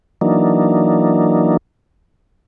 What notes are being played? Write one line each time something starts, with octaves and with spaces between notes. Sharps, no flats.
E3 F#3 A#3 D4 D#4